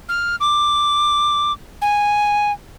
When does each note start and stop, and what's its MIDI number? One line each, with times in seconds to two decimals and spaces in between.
0.09 0.36 89
0.40 1.52 86
1.82 2.52 80